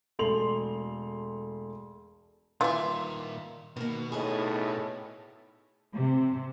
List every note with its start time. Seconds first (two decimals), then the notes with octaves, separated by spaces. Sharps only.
0.19 E1 A3 C6 F7 F#7
2.61 A#2 D#3 E3 F4 E5 F5
3.76 B2 D#3 A#3
4.12 A2 C#4 D#4 G#4
5.94 C3